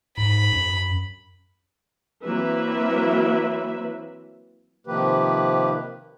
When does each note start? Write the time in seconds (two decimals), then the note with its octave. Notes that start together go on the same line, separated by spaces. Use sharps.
0.17 G#2 B5
0.52 F#2
2.23 E3 F#3 A#3 C4 B4 E5
4.87 C3 D#3 F3 A#3 G4 B4